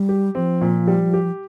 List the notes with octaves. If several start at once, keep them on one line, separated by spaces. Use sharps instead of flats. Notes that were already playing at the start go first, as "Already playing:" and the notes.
Already playing: G3
G4
F3 C4
A#2
G3
G4